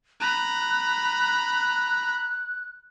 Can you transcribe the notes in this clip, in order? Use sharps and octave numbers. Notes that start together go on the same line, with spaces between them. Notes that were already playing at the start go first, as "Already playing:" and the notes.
A#5 B5 F#6